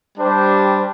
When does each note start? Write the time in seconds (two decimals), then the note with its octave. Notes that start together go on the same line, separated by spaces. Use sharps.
0.17 G3 D4 G4 C5